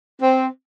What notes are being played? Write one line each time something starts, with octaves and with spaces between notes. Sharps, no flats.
C4